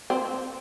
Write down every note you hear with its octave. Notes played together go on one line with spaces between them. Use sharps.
C4